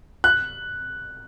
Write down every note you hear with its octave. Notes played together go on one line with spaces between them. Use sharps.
F#6